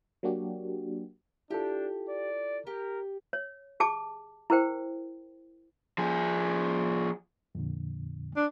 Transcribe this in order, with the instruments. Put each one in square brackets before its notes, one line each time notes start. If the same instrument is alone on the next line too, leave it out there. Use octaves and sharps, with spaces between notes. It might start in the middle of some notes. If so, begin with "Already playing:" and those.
[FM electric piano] F#3 A#3 D4 F#4 G4
[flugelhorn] D4 [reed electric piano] E4 F4 A4 [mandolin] G4
[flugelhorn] D5
[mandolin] G4 [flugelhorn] A#4
[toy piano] C#5
G4 G#4 A5 D6
E4 G#4 A#4 C5 G5
[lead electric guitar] F3 G#4
[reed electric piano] F2 A#2 D3
[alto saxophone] D4